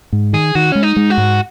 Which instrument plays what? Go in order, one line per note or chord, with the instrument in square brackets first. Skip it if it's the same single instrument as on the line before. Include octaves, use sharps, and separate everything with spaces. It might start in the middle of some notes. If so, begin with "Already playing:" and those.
[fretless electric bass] G#2
[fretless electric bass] D#3 [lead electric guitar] G#4
[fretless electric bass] D#3 [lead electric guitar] F#4
[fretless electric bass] G#3 [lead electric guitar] C#4
[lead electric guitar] D#4
[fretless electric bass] G#3
[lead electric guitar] F#4
[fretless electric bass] G#2